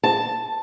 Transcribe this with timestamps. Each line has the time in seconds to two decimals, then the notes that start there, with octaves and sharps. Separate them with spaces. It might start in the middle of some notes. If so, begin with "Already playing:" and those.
0.04 A5